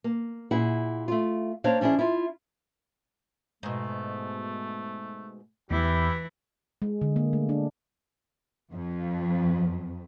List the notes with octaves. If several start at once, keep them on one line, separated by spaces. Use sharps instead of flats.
A#3
A#2 E4 G#4 F#5
A3 F4
A#3 D4 C5 C#5 F5
F3 C#4 D4 E4 G#4
E4 F4
G#2 B2 A3
E2 E3 E4 G4
G#3
D3
A#3
A3
D4
F2